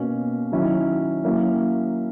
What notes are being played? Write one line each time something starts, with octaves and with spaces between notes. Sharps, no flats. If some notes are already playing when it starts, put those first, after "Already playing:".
Already playing: B2 A#3 C#4
D#3 F#3 C#4 E4
F#3 A#3 C#4 E4